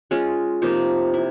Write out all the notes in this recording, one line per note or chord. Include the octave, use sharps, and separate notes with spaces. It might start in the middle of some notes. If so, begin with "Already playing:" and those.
G#3 C#4 F4
C3 F3 A#3 D#4
E4